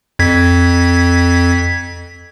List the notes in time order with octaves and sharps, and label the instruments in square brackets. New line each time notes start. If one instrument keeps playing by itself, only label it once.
[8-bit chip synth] F2 G#6 B6